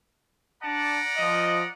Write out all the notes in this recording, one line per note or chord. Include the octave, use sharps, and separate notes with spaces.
D4 D5 F#5 A5 A#5
F3 D#5